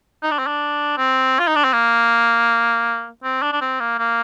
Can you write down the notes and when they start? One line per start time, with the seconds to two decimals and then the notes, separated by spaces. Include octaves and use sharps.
0.23 D#4
0.31 D4
0.39 C4
0.47 D4
0.98 C4
1.39 F4
1.47 D#4
1.55 D4
1.64 C4
1.73 A#3
3.23 C4
3.42 D4
3.52 D4
3.61 C4
3.80 A#3
3.99 A#3